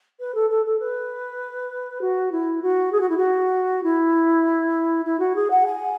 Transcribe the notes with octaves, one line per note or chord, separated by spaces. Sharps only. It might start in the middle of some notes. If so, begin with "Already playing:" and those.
B4
A4
A4
A4
B4
F#4
E4
F#4
G#4
F#4
E4
F#4
E4
E4
F#4
G#4
F#5
G#5